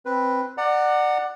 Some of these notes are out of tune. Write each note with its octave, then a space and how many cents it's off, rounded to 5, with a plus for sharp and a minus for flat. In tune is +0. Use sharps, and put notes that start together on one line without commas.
C4 +0 B4 +0
D5 +25 F#5 +0 A#5 -30